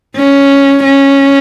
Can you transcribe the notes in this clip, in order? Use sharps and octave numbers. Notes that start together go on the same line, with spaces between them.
C#4
C#4